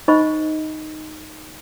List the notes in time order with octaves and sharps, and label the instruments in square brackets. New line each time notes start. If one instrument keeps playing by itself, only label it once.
[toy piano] D#4 C5 D#5 B5 C#6